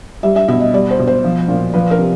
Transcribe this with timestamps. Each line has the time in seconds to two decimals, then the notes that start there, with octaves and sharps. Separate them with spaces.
0.23 G3 E5
0.36 E5
0.48 B2 E5
0.61 D#5
0.74 G3 D5
0.91 C5
0.99 B2
1.07 C5
1.24 F3
1.48 A#2
1.74 F3 B4
1.91 A#4
1.99 C3